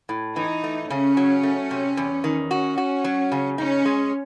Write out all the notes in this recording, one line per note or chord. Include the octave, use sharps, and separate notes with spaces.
A2
E3 D#4
A3
C#3 C#4
F#3
A3
C3
E2
D#3
C#4 F#4
F#4
F#3
C#3
C#4 D#4
G#3